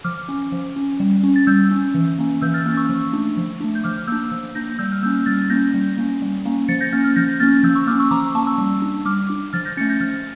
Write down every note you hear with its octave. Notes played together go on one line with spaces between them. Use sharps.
F3 D6 F6
C#4
F3
C#4
G3
C#4
A6
G3 E6 G6
C#4
E3
A#3 C#4
E3 E6 G6
F6 A6
A#3 C#4
C#6 E6
F3
A3 D4
F3
A3 D4
G6
F3 D6 F6
A#3 D4 E6 G6
F3
A#3 D4 G6 A#6
G3 E6 G6
F6
A#3 C#4 E6 G6
G3 F6 A6
A#3 C#4 G6 A#6
G3
A#3 C#4
G3
A#3 C#4
F3 A6 C#7
G6 A#6
A#3 C#4 F6 A6
F6 A6
F3 G6 A#6
A#3 C#4 F6 A6
F3 E6 G6
C#6 E6
A#3 C#4 D6 F6
C#6 E6
F3 A#5 D6
A#3 C#4 A5 C#6
C#6 E6
G3
D4
G3 D6 F6
D4
F3 F6 A6
G6 A#6
A3 C#4 A6 C#7
G6 A#6
F3 F6 A6